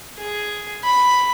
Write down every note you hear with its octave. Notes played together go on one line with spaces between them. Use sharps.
G#4
B5